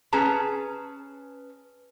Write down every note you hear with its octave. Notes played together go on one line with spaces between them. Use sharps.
C#4 G#4 B4 A5 A#5